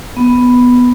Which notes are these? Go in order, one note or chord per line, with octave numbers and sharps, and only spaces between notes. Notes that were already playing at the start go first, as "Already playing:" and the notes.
B3